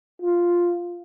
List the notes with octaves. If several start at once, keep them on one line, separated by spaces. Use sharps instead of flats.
F4